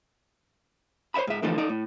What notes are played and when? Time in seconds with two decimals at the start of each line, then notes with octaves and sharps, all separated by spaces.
1.14 C5 C#5 E5 A5 B5
1.27 G#2 E5
1.42 D3 E3 F3 A3 D#4 A4
1.58 D#4 A4 D5
1.69 A2